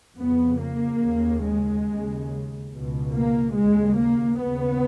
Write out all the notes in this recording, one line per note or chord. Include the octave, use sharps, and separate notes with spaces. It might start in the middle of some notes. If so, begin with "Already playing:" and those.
F2 C#3 B3
A#3
D#2 C#3
G#3
D#2 C#3
C#2 B2
A#3
D#2 C#3 G#3
A#3
D#2 C#3 B3